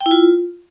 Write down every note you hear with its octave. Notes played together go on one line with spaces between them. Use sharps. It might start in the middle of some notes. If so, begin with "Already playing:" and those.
G5
E4
F4